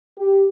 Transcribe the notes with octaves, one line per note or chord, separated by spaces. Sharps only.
G4